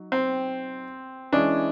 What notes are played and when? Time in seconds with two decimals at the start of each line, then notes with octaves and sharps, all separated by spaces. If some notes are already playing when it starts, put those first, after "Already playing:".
Already playing: F#3 D#4
0.12 C4
1.32 E3 G#3 C#4 D4 E4 G#4